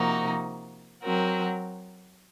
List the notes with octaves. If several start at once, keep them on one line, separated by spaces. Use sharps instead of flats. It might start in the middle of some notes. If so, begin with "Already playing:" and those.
Already playing: C3 F3 A#3 D#4 F#4
F#3 C4 F#4 A#4